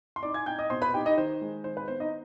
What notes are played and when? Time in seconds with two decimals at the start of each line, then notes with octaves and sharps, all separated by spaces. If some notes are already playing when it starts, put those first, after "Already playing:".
0.16 C6
0.23 D#4 D5 D6
0.34 G#5 G#6
0.46 D#4 G5 G6
0.59 D#5 D#6
0.70 B2 C5 C6
0.82 B4 B5
0.94 D#4 G4 G5
1.05 D#4 D#5
1.17 D#3 C5
1.42 G#3
1.64 D#3 C5
1.77 B4
1.88 B3 C5
2.00 D#4 D#5